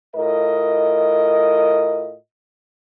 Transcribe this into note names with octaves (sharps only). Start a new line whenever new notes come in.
A2 F4 A#4 D#5